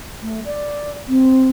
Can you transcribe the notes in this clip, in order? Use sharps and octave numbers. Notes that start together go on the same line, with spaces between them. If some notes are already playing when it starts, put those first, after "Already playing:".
A3
D5
C4